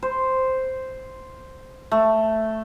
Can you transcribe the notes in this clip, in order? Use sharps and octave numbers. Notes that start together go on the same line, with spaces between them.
C5
A3